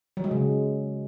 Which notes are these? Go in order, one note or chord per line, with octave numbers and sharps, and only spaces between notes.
F#3
G#3
C#3